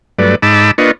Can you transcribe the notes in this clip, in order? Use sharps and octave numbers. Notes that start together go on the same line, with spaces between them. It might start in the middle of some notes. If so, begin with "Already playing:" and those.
G2 F#3 A3 B4 D5
G#2 D#4 A5 B5 D6 E6
A#3 D4 F4 B4 D#5 C#6